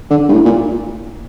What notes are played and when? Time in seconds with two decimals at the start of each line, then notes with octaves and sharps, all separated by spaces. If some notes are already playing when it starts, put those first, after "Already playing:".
0.10 D3
0.29 G2
0.33 A2
0.45 A#2